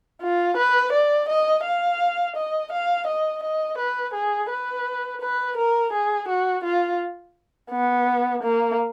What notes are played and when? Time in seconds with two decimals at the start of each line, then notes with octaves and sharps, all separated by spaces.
0.22 F4
0.57 B4
0.93 D5
1.29 D#5
1.64 F5
2.36 D#5
2.72 F5
3.07 D#5
3.44 D#5
3.78 B4
4.14 G#4
4.50 B4
5.21 B4
5.57 A#4
5.93 G#4
6.28 F#4
6.64 F4
7.71 B3
8.43 A#3